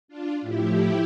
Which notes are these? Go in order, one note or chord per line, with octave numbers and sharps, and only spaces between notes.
D4 F4
A2 F3 E4 G4